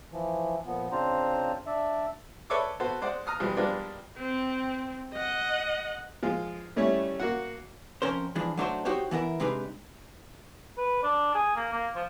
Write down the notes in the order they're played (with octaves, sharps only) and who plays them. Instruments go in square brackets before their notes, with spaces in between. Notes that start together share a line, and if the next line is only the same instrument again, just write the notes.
[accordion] E3 F3
A#2 F3 B3
C#3 C4 D4 F4 C5 A#5
D4 D5 E5
[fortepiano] A4 B4 C#5 D5 E5 D6
B3 F#4 A4 C5
G#3 C5 D5 F#5
A#5 D#6 F6 F#6
B2 E3 F3 G3 G#3
F3 G3 G#3 A#3 B3 D4
[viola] C4
D#5 F#5
[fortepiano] F3 G#3 F4
G3 A3 C#4 E4 C#5 E5
A#3 F#4 F#5
[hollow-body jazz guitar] F2 C#4 A#4 C5
E3 F3 G#3 D4
F#3 A3 D4 D#4 F#4 C5
D#4 F#4 G4 C5 C#5
E3 B3 E4 A#4
C3 G#3 D4 D#4 B4
[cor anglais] B4
D4
G#4
A#3
A#3
F3